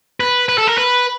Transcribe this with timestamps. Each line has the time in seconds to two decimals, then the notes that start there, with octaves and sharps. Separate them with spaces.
0.20 B4
0.48 B4
0.58 A4
0.67 A#4
0.78 B4